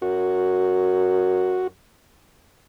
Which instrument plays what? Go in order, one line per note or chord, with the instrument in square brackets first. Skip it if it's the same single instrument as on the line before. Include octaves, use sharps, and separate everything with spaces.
[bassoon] F#2 [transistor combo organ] F#4